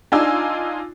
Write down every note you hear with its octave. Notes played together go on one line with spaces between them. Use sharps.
D4 D#4 F4 G#5 E6